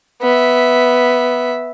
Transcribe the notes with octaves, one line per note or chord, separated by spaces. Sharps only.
B3 E5